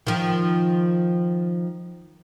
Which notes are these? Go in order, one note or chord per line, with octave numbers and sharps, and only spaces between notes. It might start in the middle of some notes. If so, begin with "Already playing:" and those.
D#3 F3